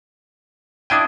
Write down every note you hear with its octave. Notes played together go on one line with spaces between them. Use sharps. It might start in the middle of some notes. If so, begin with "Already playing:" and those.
D4 E4 G5 D#6 G#6 D#7